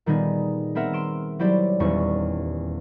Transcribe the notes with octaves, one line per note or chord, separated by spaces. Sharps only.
A#2 D#3 G3 B3 D#4 G#4
B3 C4 A#4 E5 F#5
C6 D7 E7
F#3 G3 E4 G4 C5 D5
D#1 E2 G3 C#4 C#6